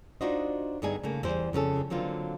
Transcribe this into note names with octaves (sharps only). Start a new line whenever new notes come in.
D4 D#4 F4 F#4 C5 D#5
G2 D3 B3 D#4 G#4 G#5
C#3 A3 A#3
E2 G3 C5
F2 C#3 C#4 A4
D3 F#3 A#3 C4 F4